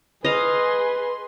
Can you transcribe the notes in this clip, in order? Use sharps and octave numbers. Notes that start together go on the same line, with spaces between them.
G#4 B4 D#5 F5 C6